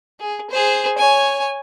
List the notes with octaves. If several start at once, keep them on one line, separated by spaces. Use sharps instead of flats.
G#4
G#4 C5
C#5 G#5